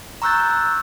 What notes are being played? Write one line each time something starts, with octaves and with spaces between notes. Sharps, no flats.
A#5 C#6 E6 F#6 G6 A6